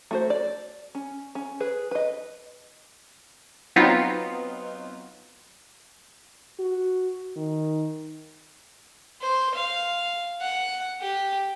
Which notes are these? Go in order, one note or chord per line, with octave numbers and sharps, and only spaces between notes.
A3 F#4 C5
D5
C#4
C#4
G#4 B4
B4 D#5
F#3 B3 C4 D#4 F4
F#4
D#3
C5
F5
F#5
G4